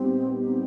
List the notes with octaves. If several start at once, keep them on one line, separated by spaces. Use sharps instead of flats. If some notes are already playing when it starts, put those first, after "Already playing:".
Already playing: A#2 G3 B3 C4 D#4 G4
C4